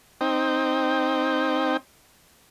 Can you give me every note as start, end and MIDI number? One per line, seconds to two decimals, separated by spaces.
0.21 1.77 60
0.21 1.77 63
0.21 1.77 79